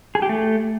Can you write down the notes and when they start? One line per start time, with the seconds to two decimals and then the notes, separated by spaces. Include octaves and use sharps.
0.15 G#4
0.22 G4
0.29 A3